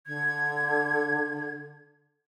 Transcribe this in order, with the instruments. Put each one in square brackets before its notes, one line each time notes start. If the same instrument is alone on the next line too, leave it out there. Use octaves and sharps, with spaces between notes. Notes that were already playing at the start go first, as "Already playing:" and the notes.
[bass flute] D3 [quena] G#6